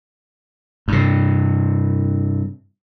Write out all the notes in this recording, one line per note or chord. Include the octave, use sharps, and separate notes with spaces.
G2 C3